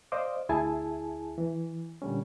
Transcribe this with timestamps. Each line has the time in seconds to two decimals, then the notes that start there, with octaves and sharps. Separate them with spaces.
0.12 C5 D5 D#5 F5 D6
0.49 D2 E4 G#4 E5 G#5 A5
1.38 E3
2.02 A#2 D3 G3 C#4